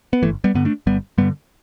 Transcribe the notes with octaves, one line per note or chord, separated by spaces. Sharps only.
B3
G1 E3 A3
G3 B3
G2 D3 B3
A3 D4
G1 G3 B3
G2 D3 G3 B3